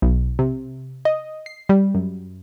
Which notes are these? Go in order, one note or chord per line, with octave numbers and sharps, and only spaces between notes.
B1
C3
D#5
C7
G3
F#2